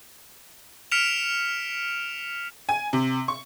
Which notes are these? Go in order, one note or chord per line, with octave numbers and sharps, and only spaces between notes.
F6 B6 C#7 D7 E7 F7
G#5
C3
C#6